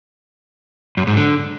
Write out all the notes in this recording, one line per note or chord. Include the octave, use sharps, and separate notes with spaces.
F#2
G#2
D3